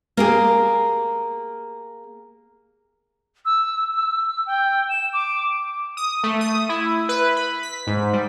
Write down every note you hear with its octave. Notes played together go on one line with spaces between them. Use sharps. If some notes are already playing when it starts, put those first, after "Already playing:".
A#3 G4 G#4
E6
E6
G5
E7
D6
D#6
A3
D#6
E4
B4
B5
B6
G#2
G3